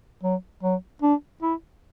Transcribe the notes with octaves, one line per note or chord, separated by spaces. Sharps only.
F#3
F#3
D4
E4